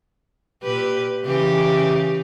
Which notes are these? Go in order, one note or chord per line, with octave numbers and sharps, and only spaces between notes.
A#2 G4 B4
C#3 E3 G4